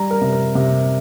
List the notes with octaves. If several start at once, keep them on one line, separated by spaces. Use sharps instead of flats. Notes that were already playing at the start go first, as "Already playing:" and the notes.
Already playing: G3 A#5
A#4
C3
A#4
C3